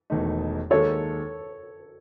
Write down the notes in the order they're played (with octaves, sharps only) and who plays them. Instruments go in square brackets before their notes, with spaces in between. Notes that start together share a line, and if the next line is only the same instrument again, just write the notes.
[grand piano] E1 E2 D#3 A3 D#4
[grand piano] D#2 D#3 G#3 [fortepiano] A4 C#5